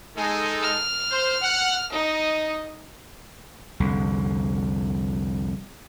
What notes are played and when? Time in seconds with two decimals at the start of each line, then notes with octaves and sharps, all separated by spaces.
0.17 G#3 D#4 A4 G#5
0.62 F6
1.11 C5
1.42 F#5
1.91 D#4 D#5
3.80 C2 F2 D3